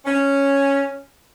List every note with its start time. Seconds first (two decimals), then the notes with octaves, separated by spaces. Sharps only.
0.05 C#4